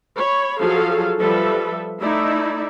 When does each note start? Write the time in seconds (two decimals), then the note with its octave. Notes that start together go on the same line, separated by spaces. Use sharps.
0.18 C#5 B5
0.60 F3 F#3 G#4 A4 F5
1.19 F3 G3 A4 B4 E5
2.02 A3 D#4 E4 D5 E5